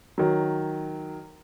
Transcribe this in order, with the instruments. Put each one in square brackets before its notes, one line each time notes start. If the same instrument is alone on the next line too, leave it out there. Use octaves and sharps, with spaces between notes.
[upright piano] D#3 F#3